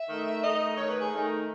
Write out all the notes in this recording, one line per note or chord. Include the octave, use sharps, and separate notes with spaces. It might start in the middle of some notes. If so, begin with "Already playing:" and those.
Already playing: E5
D#3 A3 D#4
D#3 A3 D#4 D#5
D#3 A3 D#4 C#5
B4
G#4
D#3 A3 D#4